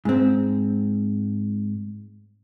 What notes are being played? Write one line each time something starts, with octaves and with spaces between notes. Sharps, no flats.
G#2 C4